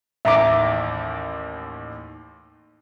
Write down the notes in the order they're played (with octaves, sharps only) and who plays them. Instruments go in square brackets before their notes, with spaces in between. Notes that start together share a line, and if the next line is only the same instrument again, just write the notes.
[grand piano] A1 D#2 [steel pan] E5 A#5 D6